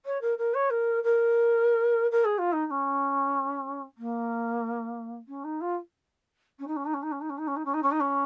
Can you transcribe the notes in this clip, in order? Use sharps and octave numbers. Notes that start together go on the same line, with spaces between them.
C#5
A#4
A#4
C#5
A#4
A#4
A#4
G#4
F4
D#4
D#4
C#4
A#3
C#4
D#4
F4
C#4
D#4
C#4
D#4
C#4
D#4
C#4
D#4
C#4
D#4
C#4
D#4
C#4
D#4
C#4
D#4
C#4